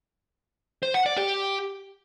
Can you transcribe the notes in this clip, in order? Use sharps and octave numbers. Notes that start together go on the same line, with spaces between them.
C5
F#5
D5
G4